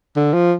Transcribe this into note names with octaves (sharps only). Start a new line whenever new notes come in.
D3
F3